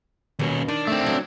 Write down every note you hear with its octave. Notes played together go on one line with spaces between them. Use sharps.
D#2 B2 A#3 C#4
D#3 D4
A3 C4
F#3